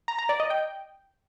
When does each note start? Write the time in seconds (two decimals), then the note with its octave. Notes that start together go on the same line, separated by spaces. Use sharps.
0.08 A#5
0.19 A#5
0.29 D5
0.40 D#5
0.50 G5